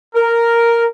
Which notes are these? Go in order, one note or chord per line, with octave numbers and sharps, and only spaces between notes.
A#4